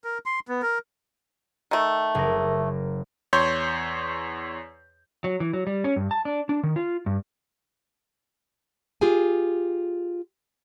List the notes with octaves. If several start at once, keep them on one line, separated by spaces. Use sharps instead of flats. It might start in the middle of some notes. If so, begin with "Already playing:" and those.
A#4
C6
B3
A#4
D#3 A3
F#1 A#4
E2 C#5 C6 G6
F#3
E3
F#3
G3
C#4
G2
A5
D4
D4
D#3
F4
G2
F4 G4 G#4 G#5